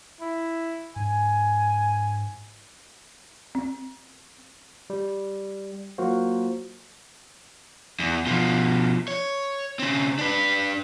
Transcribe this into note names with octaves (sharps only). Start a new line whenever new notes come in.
E4
G#2 G#5
C4
G3
F#3 A#3 F4 F#4 C5
E2
B2 F3
C#5
C#3 C4
D4 B4